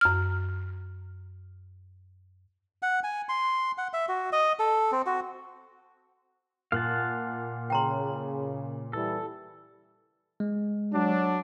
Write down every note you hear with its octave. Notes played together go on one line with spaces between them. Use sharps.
F#2 F6
F#5
G#5
C6
F#5
E5
F#4
D#5
A4
C4
F#4
A#2 F5 F#5 A5
C#3 G5 A#5 C6
E3 G3 A4
G#3
F#3 D4